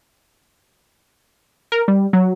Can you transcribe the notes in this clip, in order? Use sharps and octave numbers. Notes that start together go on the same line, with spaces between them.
A#4
G3
F#3